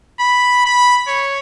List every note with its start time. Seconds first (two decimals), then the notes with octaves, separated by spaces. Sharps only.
0.20 B5
0.66 B5
1.07 C#5